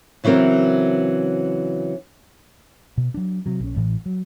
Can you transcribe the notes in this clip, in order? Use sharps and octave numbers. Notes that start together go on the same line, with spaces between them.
C#3 E3 F#3 C4 A#4
B2
F#3 D4
C3 F#3
A#1 C#4
A1 A2 E3
F#3